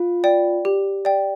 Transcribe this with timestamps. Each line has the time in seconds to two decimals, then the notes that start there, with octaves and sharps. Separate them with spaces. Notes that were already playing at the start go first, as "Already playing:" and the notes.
Already playing: F4
0.24 D5 G5
0.65 G4
1.05 D5 G5